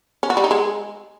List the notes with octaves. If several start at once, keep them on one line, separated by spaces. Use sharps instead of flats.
C#4
F#4
G3
D#4
G#3